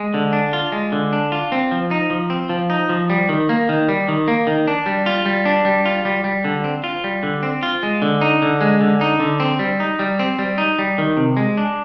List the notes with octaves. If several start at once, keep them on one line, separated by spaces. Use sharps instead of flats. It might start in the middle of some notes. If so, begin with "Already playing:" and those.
Already playing: G#3
D3
D4
F4
G#3
D3
D4
F4
C4
F3
D#4
F3
C4
F3
D#4
F3
G3
D#3
A#3
D#3
G3
D#3
A#3
D#3
D4
G3
F4
G3
D4
G3
F4
G3
G3
D3
C4
F4
G3
D3
C4
F4
G#3
D3
D#4
D3
G#3
D3
D#4
D3
C4
G3
D#4
G3
C4
G3
D#4
G3
D#3
C3
G#3
D4